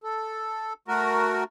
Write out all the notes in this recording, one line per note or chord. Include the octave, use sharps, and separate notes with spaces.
A4
A3 F#4 A#4